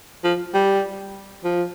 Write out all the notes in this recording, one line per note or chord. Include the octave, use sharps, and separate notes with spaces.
F3
G3
F3